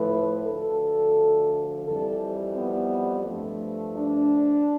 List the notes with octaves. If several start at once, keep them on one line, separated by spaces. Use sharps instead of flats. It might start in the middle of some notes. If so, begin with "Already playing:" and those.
Already playing: A2 F3 A3 B4
D2 D3 F3 A4
F2 E3 G3 A4
B3
G2 F3 A3
D4